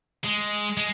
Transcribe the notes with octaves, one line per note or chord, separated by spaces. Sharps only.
G#3
G#3